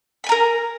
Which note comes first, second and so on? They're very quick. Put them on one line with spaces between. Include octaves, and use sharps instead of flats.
B5 G#5 A#5 A#4